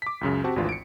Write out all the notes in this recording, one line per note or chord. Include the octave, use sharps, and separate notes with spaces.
D6 B6
C#2 F#2 C#3
C4 F#4 G4 A5
G#1 D2 E3 D4 F4
C#7 D7